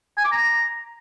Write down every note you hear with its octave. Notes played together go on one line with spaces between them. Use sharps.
G#5
D6
A#5